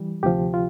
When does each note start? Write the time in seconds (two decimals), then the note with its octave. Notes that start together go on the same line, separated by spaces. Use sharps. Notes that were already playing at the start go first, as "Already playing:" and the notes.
Already playing: E3 G3
0.23 D2 C3 F3 G4
0.54 F4